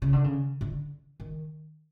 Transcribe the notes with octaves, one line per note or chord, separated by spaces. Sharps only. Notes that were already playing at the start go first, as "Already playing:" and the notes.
C#3
D3
C#3
D3
D#3